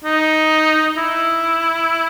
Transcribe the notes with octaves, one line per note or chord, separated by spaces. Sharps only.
D#4
E4